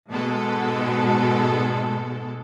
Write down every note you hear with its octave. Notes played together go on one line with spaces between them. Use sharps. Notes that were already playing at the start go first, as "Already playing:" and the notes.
G#2 B2 G#3 A4